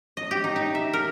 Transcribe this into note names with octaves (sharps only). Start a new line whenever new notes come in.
D#5
G4
D#4
D#4
E5
A#4